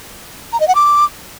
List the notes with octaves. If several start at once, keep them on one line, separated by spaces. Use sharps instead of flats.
A#5
D#5
F#5
D6